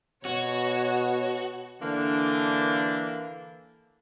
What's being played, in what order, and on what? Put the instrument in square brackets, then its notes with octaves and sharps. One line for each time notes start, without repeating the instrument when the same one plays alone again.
[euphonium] B2 [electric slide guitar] F#4 [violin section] C#5
[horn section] D3 E3 A#3 D4